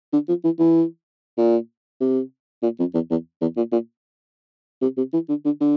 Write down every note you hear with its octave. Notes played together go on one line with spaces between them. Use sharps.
D3
F3
E3
E3
A#2
C3
A#2
F2
E2
E2
E2
A#2
A#2
C3
C3
E3
D3
D3
D3